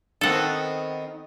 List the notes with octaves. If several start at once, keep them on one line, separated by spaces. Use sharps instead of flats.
D#3 B3 C4 A4 F#5